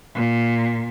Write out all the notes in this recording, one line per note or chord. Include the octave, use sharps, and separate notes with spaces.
A#2